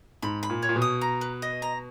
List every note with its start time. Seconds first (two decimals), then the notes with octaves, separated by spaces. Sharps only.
0.22 G#2 B5
0.43 B5
0.50 A#2
0.62 C#5
0.69 A#2
0.76 B2
0.82 D#6
1.01 A#5
1.21 B4
1.42 D#5
1.62 A#5